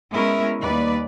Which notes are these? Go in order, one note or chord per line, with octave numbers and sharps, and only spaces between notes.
G#3 B3 C#4 E4 A#4
D#2 G3 B4 D5